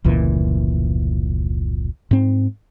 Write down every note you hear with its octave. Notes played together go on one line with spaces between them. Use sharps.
F1 C#2 A#2 E3
G#2 C4